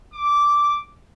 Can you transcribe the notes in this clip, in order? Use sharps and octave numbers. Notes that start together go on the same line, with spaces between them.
D6